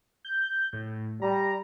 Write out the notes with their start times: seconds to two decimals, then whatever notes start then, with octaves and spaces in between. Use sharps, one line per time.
0.25 G6
0.73 A2
1.22 G3 A#5